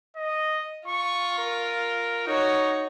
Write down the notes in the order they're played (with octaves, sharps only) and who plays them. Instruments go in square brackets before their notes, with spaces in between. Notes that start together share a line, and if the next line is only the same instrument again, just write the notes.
[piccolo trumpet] D#5
[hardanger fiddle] F4 [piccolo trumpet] C#6
[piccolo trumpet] A#4
[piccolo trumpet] D#4 [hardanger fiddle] F#4 C#5